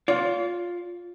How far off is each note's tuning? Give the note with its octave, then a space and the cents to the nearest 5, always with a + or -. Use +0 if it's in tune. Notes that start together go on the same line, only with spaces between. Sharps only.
F4 +10 D5 -45